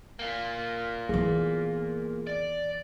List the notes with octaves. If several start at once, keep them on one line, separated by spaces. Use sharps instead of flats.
A#3 F4
E3 B3 G#4
D5